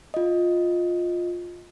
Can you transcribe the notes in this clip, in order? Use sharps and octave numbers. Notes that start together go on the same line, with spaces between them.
F4 D#5